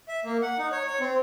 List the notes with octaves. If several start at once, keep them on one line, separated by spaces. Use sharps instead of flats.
E5
A#3
F#5
D#4
C#5
C#5
C4